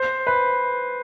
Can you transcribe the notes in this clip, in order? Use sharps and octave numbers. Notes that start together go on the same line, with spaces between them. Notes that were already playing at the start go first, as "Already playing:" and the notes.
Already playing: C5
B4